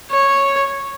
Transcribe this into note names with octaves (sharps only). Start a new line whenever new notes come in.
C#5